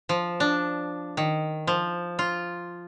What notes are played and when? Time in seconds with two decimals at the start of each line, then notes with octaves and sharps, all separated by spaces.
0.09 F3
0.40 D4
1.17 D#3
1.67 F3
2.19 F4